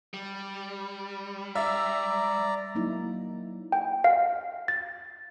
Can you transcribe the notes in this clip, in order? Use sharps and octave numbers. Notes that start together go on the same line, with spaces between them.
G3
D5 E5 A#5
F#3 A#3 D#4 E4
G5
F5
A6